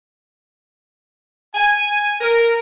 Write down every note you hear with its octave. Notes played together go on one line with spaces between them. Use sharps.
G#5
A#4